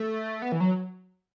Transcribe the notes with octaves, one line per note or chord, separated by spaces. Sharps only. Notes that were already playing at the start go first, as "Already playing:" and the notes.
Already playing: A3
B3
E3
F#3